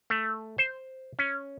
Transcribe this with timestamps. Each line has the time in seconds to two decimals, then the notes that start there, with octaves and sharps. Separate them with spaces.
0.10 A3
0.58 C5
1.19 C#4